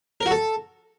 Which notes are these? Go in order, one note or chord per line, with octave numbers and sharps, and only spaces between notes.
A#4
F#4
A4